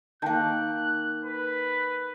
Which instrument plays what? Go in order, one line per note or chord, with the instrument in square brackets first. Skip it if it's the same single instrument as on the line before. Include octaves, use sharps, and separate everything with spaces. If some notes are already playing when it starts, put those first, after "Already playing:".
[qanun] D#3 A#3 [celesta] G5 A5 G6 [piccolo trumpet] F#6
[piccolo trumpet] B4